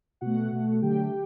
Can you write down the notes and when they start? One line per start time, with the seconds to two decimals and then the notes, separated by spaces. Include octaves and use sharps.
0.21 B2 A3 F#4 F#5
0.52 B2 A3
0.82 D3 F#3 A3 G4 G5